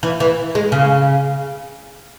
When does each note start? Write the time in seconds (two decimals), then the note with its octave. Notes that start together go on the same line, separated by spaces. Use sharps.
0.03 E3
0.20 E3
0.55 G#3
0.72 C#3